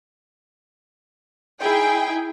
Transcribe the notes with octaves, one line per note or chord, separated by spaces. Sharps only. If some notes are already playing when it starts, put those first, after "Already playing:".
D#4 E4 G#4 G5